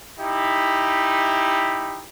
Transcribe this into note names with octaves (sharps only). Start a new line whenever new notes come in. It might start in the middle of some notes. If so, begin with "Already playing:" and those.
D#4 E4 G4